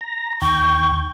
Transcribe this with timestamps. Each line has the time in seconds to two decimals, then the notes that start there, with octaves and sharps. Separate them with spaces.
0.01 A#5
0.42 D#2 G5 C#6